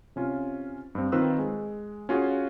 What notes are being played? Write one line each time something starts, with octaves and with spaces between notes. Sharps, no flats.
C3 C#4 F4
G2 C4
D#3 C4 F4 B4 E6 F#6
G#3
C#4 F4 F#4 G#4 F5